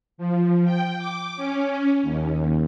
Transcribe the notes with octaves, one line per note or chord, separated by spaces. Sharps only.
F3
G5
D6
C#4
D#2